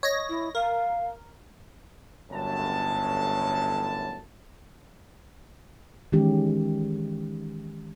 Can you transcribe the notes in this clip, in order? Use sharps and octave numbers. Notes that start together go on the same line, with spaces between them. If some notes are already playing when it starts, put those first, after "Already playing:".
C#5 D#5 A#6
E4
A#4 F5
G1 F#2 A2 A5
D#3 E3 G#3 C#4 G4